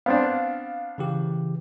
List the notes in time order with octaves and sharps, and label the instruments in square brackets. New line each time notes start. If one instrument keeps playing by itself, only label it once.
[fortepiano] B3 C4 D4 [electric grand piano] F5
[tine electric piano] C#3 E3 G4